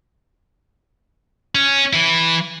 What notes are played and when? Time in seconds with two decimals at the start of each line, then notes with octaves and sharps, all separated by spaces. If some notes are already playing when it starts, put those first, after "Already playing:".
1.55 C#4
1.93 E3 E4